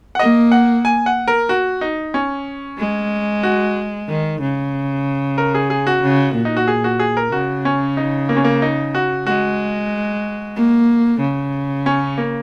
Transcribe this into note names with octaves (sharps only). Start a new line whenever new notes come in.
F#5
A#3 D#5
F#5
G#5
F#5
A#4
F#4
D#4
C#4
G#3
F#4
D#3
C#3
A#4
G#4
G#4
F#4
C#3
A#2
D#4
F#4
G#4
F#4
G#4
A#4
C#3 F#4
C#4
D#4
A#3
C#4
A#3
D#4
F#4
G#3 F#4
A#3
C#3
C#4
A#3